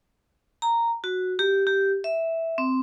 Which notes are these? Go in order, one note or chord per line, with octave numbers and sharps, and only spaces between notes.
A#5
F#4
G4
G4
E5
C4